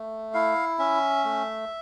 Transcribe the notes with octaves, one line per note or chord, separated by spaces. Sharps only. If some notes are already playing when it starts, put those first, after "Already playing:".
Already playing: A3
E4 F5
C#4 E5
A3